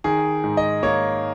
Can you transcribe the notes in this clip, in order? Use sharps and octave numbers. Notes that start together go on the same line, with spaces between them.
D#3 G#4
G#2
D#5
A#3 C#5